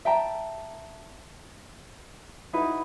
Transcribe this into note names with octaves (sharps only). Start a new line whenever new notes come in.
E5 G5 A5 A#5
D#4 E4 F#4 B4